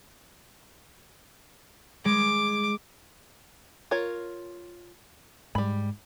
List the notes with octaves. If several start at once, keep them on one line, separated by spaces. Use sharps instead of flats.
G#3 D6
F4 A#4 C#5
G#2 G3 B5